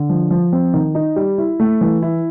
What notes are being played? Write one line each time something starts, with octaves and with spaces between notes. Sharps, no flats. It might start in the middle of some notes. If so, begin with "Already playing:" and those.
Already playing: D3
F3
F3
C4
D#3
D#4
G3
E4
A3
E3
E4